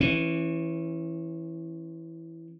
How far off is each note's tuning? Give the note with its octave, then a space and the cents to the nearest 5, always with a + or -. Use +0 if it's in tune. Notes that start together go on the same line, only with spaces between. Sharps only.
E3 +0 C#4 -30